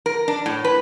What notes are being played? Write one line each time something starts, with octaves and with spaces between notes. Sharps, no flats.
A#4
D4
A2
B4